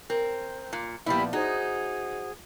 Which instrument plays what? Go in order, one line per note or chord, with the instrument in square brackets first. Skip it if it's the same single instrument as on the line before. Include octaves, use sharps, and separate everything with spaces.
[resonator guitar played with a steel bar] C4 [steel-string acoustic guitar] A#4
[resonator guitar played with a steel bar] A#2
[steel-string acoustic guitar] A#2 F3 B3 [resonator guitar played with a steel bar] G3 E4 [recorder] B5
[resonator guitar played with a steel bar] D#4 [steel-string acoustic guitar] F#4 C5 [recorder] G#4